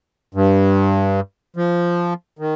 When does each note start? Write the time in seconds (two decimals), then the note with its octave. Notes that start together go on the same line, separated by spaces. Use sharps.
0.35 G2
1.56 F3
2.39 D#3